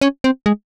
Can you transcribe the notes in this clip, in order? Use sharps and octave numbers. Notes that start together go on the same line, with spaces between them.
C#4
C4
G#3